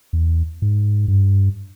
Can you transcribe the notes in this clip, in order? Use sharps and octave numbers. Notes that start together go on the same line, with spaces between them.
E2
G#2
G2